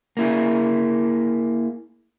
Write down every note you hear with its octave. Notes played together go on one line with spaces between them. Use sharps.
A#3 E4 G#4